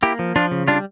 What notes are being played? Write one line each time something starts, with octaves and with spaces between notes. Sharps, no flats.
A#3 E4 G4
F3
F3 D4 F4
C#3
G3 D4 F4